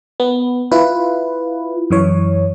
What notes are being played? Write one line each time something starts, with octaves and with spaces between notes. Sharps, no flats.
B3
E4 F4 B4
F#2 E3 C#5